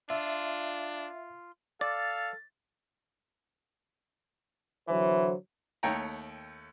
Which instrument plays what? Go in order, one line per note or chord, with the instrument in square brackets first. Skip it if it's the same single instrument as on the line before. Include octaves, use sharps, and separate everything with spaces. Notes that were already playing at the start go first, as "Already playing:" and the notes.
[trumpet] D4 [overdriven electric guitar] F4 [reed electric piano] E5
[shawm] A4 [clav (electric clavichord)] D5 [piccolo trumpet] F5 [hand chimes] A6
[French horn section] D3 F#3 C5 [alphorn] E3
[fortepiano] D#2 A3 C#5 G5 A#5